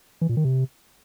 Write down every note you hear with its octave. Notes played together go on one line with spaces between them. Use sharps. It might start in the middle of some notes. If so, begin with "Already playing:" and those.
E3
A#2
D#3
C3